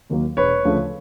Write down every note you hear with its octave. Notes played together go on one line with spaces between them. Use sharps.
D#2 D#3 F#3 A#3
E1 B4 C#5
D2 C#3 F3 A3